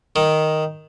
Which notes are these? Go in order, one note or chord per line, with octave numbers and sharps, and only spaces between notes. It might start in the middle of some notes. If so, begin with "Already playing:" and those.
D#3